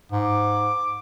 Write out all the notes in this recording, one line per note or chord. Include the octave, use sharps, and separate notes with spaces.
G#2 D6